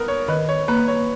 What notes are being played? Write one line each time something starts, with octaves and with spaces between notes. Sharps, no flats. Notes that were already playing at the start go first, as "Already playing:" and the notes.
Already playing: B3 A#4
C#5
D#3 B4
C#5
A#3 B4
C#5